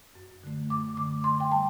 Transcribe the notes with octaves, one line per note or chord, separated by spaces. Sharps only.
F#2
D3 A3
F#2 D6
D3 A3 D6
D3 C6
G5
G3 A5